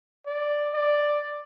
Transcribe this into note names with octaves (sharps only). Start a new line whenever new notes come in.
D5
D5